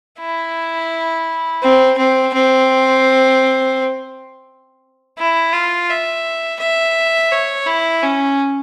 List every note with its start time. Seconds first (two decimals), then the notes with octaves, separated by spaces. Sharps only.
0.20 E4
1.62 C4
1.98 C4
2.34 C4
5.19 E4
5.53 F4
5.90 E5
6.60 E5
7.32 C#5
7.66 E4
8.03 C#4